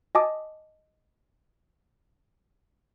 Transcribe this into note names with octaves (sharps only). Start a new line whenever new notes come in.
D#5 G#5 A5 D6 D#6